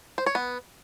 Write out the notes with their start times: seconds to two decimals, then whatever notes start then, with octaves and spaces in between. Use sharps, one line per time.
0.18 C5
0.26 C#5
0.35 B3